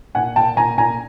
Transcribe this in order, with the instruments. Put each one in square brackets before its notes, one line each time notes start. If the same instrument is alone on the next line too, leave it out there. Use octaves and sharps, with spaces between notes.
[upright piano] A#2 F#5 G#5
A#2 G5 A5
A#2 G#5 A#5
A#2 G#5 A#5